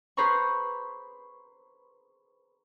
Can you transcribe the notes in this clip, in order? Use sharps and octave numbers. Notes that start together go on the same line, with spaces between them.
G#4 B4 C5 A#5 B5 C#6